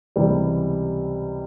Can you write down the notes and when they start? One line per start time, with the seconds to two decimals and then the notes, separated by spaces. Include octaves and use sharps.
0.16 C#2 C3 E3 G3